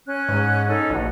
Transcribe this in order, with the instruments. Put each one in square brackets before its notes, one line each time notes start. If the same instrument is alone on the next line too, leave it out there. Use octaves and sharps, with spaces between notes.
[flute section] C#4 F#6
[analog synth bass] G#2
[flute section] C#4 D#4 A4
[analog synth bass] A#1 [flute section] F#4